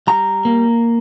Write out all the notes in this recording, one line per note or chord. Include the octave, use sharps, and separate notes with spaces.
G3 A#5
A#3